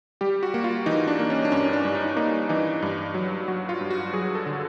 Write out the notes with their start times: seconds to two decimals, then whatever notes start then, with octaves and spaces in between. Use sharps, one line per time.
0.21 G3 G4
0.43 F#4
0.54 A#3
0.64 F4
0.86 E3 D#4
1.07 D4
1.19 A#3
1.30 C#4
1.45 D4
1.52 G2 C#4
1.73 D4
1.85 G2
1.95 D#4
2.17 A#3 D#4
2.49 E3 D#4
2.82 G2
3.14 F#3
3.48 F#3 F#4
3.69 F4
3.81 G2
3.91 F#4
4.13 F#3 G#4
4.35 A4
4.46 D3